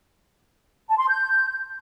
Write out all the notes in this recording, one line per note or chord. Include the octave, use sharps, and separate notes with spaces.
A5
C6
G6